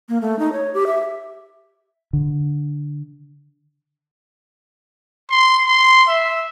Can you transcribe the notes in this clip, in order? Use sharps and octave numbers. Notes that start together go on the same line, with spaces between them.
A#3
A3
D#4
C#5
G4
E5
D3
C6
C6
E5